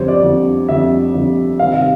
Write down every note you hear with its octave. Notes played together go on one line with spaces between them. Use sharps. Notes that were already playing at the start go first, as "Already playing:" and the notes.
Already playing: F2 D3 G3 C5 C#5
D5
F2 D3 G3
F2 D3 G3 E5
F2 D3 G3
C3 D#3 G3 F5
F5